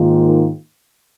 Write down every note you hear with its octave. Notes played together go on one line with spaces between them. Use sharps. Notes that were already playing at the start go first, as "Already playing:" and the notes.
Already playing: G#2 D#3 A#3 F4